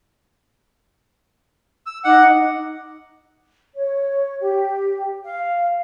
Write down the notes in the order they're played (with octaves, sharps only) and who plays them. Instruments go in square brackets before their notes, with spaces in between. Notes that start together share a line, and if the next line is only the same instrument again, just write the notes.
[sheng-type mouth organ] E6
[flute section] D#4 D#5 D6 [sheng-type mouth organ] F#5
[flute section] C#5
G4
F5